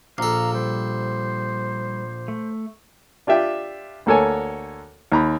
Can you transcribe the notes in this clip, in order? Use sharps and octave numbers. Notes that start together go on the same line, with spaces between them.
A#1 A4 F5 A#5
G3 C5
A3
D4 F4 G4 E5 G5
D2 A#3 A4 C#5 G#5
D#2 A#5 B5